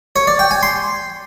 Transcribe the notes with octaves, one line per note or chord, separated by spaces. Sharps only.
C#5
D5
G5
G#5
C6